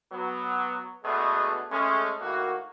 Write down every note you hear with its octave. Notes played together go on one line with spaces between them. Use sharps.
F#3 B3
B2 G#3 A3 B3 D4 G#4
G#3 A3 C#4
A2 D#3 A#3 F#4